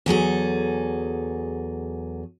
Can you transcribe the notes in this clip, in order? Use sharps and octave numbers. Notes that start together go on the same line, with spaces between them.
E2 F#3 G#4 A4